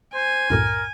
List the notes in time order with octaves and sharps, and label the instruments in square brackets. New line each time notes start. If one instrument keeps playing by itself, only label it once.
[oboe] C5 [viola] G#5
[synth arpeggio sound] C2 F#2 A2 [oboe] A#4